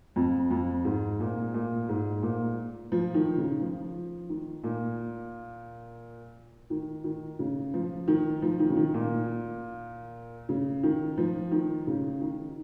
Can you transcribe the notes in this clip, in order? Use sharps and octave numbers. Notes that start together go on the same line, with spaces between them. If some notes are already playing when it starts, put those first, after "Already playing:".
F2
F2
G#2
A#2
A#2
G#2
A#2
F3
D#3
C#3
F3
D#3
A#2
D#3
D#3
C#3
F3
D#3
F3
D#3
C#3
D#3
A#2
C#3
D#3
F3
D#3
C#3
D#3